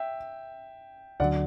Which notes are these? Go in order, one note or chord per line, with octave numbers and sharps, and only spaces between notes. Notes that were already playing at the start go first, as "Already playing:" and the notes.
Already playing: E5 G5
D2 D3 F#3 D5 F#5